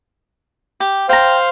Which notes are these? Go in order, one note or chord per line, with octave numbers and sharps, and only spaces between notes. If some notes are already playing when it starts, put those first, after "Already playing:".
G4
C5 F5 G5 A#5